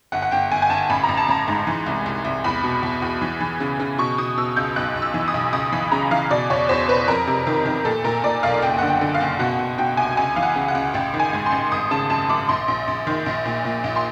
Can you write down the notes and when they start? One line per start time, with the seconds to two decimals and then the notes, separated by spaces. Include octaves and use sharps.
0.12 G1 F#5
0.22 F#5
0.31 G1 G5
0.51 G1 G#5
0.62 G#5
0.70 G1 A5
0.90 A1 B5
1.04 A#5
1.09 A1
1.17 A5
1.28 A1 A#5
1.48 G#2
1.67 E3
1.86 C2
2.06 C2
2.25 C2
2.44 E2 B5
2.64 B2
2.83 E2
3.02 E2
3.22 E3
3.41 E3
3.60 C#3
3.79 C#3
3.98 B2 C#6
4.18 B2 D#6
4.37 B2 E6
4.56 C#2 G6
4.76 B1 F#6
4.95 B1
5.02 E6
5.14 E3
5.28 D#6
5.34 B1
5.53 C#2 D#6
5.72 E3 B5
5.92 C#3 A#5
6.11 E3 F5
6.31 B2 D5
6.50 E2 C#5
6.69 E2 C5
6.88 B2 B4
7.08 F2 A#4
7.27 C3
7.47 D#3
7.66 D#3
7.85 A#2 A4
8.04 A#2 A#4
8.24 A#2 D5
8.43 B1 F5
8.62 F#1 G5
8.78 D3 F#5
8.88 G5
9.01 D3
9.14 F5
9.21 F#1
9.39 B2 F#5
9.59 B2
9.78 B2 G5
9.97 C2 G#5
10.17 C#2 G#5
10.36 E3 F5
10.43 F#5
10.55 C#3
10.68 F#5
10.75 C#2
10.94 A1 G5
11.14 D#3
11.20 G#5
11.33 G#2
11.46 C6
11.52 A1
11.72 G#1 D#6
11.91 C#3 A5
12.10 F#2 A5
12.29 F#2 D6
12.49 A#1 C6
12.68 A#1
12.88 A#1
13.07 D#3
13.26 A#1
13.45 A#2
13.65 A#2
13.84 A#1
13.96 C6